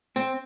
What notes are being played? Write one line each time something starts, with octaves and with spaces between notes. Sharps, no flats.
C4